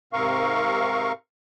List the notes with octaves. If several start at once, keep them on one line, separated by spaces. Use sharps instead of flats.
G#2 C3 C4 A#4 F5 C#6